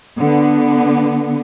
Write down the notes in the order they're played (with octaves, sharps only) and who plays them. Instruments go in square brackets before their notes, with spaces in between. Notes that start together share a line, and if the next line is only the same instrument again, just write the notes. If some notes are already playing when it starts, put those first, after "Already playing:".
[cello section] D3 B3